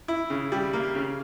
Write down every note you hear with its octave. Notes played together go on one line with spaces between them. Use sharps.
E4
C#3
G3
A#3
C#3